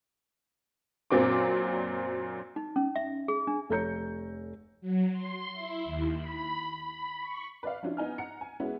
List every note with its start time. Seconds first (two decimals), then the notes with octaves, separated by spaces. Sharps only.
1.10 F#2 A#2 F#3 C4 D4 D6
2.56 D#4
2.76 C#4
2.96 E5
3.28 G#4
3.47 D4
3.69 F1 A4 C#5 A#5 G6 C#7
4.81 F#3
5.12 C6
5.53 E4
5.85 D#2
6.17 B5
6.84 B5
7.20 C#6
7.63 B4 D5 F5
7.83 F3 C#4 D4 E4 F4
7.97 B3 D#4 G#5 F6
8.18 F#5 A#5 C#7
8.41 G#5
8.60 G#3 B3 C#4 E4 F#4